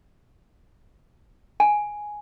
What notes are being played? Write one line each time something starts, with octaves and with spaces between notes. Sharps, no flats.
G#5